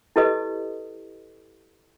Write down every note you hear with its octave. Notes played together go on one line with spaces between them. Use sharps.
E4 G4 A4 B4 D#5 D#6